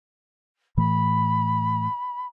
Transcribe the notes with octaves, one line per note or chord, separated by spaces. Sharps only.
A2 E3 A3 B5